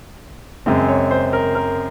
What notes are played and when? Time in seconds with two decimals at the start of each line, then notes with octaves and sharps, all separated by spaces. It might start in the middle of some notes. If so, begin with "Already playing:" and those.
0.66 F#2 C#3 G#3 C4
0.88 C#5
1.11 C5
1.33 A#4
1.55 A#4